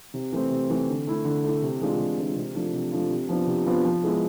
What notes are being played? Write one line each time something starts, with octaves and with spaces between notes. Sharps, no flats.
C3
E3 A3 C4
C3
E3 A3 C4
D3
A3 E4
D3
A3 E4
C3
E3 G#3 D4 F4
C3
E3 G#3 D4 F4
C3
F3 A3 D4 F4
C3
F3 A3 D4 F4
C3
F3 B3 D4 F4
C3
F3 B3 D4 F4
F3
G#3 B3 E4